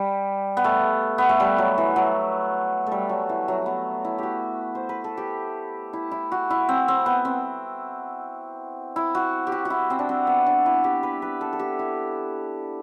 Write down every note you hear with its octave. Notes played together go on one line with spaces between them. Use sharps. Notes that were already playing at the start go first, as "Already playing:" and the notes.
Already playing: G3
B3
A3
B3
A3
G3
F#3
E3
F#3
A3
G3
F#3
E3
F#3
B3
E4
F#4 G4
C5
B4
A4
G4
E4
E4
F#4
E4
C4
C4
B3
C4
E4
F#4
G4
F#4
F#4
E4
C4
D4
C4
B3
D4
E4
G4
B4
B4
A4
A4
G4
E4